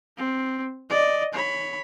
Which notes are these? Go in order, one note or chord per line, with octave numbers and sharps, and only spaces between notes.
C4
D5 D#5
C#5 B5